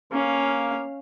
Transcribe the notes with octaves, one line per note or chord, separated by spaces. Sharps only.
A#3 C#4 F5